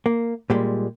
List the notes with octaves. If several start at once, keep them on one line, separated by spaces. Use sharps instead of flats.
A#3
A#2 G3 G#3